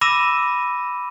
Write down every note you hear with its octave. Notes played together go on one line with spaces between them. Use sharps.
B5 D6 E6 A#6 D#7 E7